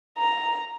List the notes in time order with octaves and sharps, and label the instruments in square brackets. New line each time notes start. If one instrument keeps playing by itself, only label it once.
[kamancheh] A#5